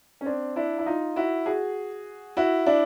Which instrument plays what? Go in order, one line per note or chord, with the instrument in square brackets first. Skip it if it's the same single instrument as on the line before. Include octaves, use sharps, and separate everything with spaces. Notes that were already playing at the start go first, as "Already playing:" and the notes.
[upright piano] C#4
C4 D4
D4 E4
E4
D#4 F4
E4 F#4
F#4 G#4
E4 F#4
D4 E4